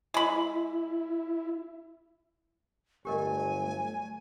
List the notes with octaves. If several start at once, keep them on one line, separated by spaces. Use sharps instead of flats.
G#3 E4 B5
G1 F#3 A3 G4 A#4 D#5 G#5